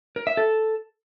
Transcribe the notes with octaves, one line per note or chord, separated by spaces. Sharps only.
A#4
E5
A4